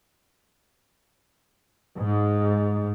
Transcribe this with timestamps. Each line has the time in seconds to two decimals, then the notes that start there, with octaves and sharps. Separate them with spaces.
1.97 G#2